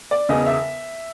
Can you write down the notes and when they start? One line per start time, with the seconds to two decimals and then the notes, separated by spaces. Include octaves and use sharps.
0.11 D5
0.29 E1 E2 C#3 D#5
0.46 E5